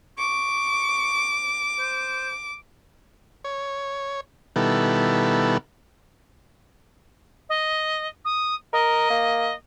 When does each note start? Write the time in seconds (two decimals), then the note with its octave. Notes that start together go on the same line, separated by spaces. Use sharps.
0.18 C#6 D6
1.79 C5
3.44 C#5
4.56 B2 D#3 G3 B3 E4 A4
7.49 D#5
8.25 D#6
8.73 A#4 D#5
9.10 A#3